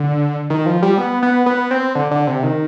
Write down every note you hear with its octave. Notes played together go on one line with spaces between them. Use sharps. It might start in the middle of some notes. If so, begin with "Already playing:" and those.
Already playing: D3
D#3
F3
G3
B3
B3
B3
C4
D3
D3
C3
D#3